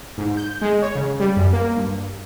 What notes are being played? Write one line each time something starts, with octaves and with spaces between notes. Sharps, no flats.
G#2
G6
G#3
C#5
C#3
G3
F#2
A#3
G2